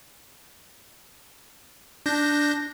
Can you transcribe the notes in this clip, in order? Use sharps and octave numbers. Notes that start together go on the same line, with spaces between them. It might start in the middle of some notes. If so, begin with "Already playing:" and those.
D4 G6 A#6